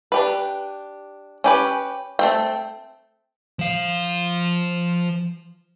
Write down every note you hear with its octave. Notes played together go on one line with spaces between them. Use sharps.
D4 G4 B4
C#4 G4 B4
A3 C4 G5
F3 F5